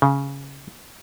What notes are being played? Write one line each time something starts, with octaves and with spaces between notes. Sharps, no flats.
C#3